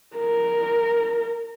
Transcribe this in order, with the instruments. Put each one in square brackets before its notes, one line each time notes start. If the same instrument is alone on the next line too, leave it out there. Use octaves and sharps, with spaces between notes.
[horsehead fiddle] A#4